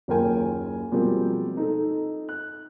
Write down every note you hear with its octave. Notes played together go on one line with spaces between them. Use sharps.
F#1 D#2 F4 A#4 G5 G#5
B2 F3 G3 G#3 A#3 C4
D#4 A4
F#6